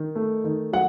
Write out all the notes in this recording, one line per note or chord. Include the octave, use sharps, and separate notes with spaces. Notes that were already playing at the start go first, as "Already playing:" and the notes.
Already playing: D#3
A3
D#3
F#3 F#5